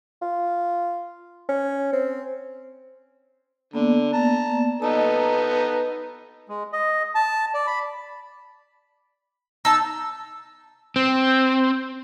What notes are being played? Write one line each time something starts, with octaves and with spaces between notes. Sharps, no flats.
F4
C#4
C4
D3 A#3 B3 D5
A5 A#5
B3 D#4 A4 D#5 A#5
G#3
D#5
A5
D5
B5
D#4 A5 E6
C4